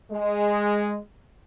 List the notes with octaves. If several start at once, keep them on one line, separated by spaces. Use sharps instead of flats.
G#3